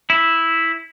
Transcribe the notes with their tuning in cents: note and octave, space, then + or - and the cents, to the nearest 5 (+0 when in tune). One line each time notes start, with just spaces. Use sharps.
E4 -5